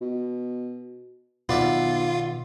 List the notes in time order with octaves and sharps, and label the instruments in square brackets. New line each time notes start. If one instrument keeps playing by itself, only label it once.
[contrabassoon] B2
[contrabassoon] B1 [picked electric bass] B2 D#3 [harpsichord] B3 D5 E5 [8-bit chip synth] F4